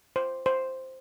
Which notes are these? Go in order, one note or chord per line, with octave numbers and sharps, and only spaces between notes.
C5
C5